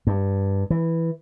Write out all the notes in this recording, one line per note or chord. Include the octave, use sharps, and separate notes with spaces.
G2
E3